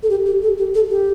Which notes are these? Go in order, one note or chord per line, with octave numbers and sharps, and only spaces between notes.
A4
G4
G4
A4
G4
A4
G4